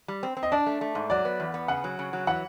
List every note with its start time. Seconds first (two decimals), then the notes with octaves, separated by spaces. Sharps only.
0.08 G3
0.23 C4
0.37 C4
0.43 D#5
0.52 D4 D5
0.66 A3
0.81 A3
0.95 G#2
1.10 F#3 D5
1.25 B3
1.40 E2
1.54 B3
1.68 C#3 F#5
1.84 F#3
1.99 C#3
2.13 F#3
2.27 E3 F#5